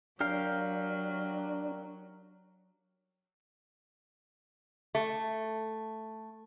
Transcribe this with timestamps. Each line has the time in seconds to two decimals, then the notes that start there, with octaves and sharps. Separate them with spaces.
0.20 F#3 D4 G4 A#4 F5
4.95 A3